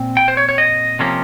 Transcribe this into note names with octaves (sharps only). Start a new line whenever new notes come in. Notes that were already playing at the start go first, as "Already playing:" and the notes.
Already playing: A#2 C4
G5
C5
C#5
C#5
D#5
C3 F3 A#3 C#4